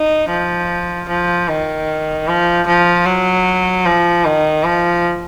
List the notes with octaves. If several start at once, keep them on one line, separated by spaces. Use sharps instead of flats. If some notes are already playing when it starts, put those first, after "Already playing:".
Already playing: D#4
F3
F3
D#3
F3
F3
F#3
F3
D#3
F3